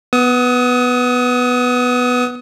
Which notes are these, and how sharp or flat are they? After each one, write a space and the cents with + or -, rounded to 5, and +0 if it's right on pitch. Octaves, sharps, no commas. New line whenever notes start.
B3 +0 D#6 +30